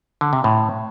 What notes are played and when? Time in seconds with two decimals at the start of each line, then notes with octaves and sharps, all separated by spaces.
0.21 D3
0.33 C3
0.44 A2